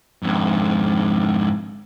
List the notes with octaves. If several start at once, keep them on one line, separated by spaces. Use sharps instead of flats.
F2 G#2